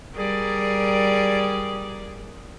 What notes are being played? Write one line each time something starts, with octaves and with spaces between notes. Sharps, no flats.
G3 G#4 A#4 D5